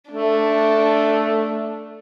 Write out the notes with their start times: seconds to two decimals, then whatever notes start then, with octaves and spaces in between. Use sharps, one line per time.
0.11 A3 D4